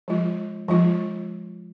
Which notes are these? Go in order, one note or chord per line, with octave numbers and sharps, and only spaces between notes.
F3 G#3 F4
F3 G#3 F4